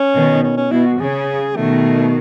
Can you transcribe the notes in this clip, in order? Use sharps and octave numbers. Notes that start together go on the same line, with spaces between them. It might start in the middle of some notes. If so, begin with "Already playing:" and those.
Already playing: C#4
B2 D#3
C#4
C#4
B2 E4
F#4
C#3 G#4
B2 D#3 A3